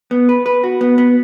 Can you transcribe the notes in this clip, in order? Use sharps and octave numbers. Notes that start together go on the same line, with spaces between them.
B3
B4
B4
F#4
B3
B3